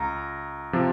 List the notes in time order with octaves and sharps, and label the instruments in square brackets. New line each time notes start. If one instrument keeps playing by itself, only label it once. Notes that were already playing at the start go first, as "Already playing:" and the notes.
Already playing: [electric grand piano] C#2 A#5
C3 F3